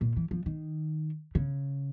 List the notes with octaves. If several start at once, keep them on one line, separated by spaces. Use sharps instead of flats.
A#2
E3
F3
D#3
C#3